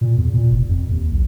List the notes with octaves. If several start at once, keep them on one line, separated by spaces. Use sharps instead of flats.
A#2
E2
A#2
F1
F2
D#2
B1